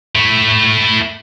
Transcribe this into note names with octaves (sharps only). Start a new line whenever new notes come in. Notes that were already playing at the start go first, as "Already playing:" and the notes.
A3 E4